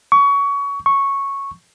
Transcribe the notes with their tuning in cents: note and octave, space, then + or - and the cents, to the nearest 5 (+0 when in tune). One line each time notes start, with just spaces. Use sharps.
C#6 +25
C#6 -5